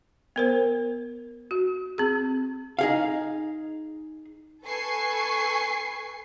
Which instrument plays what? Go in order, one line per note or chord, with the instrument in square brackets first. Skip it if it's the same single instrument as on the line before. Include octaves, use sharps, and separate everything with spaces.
[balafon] B3 A#4 C5
F#4
C4 G#4
[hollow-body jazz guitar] D#4 G#4 F5
[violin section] A4 B4 G#5 C#6 C7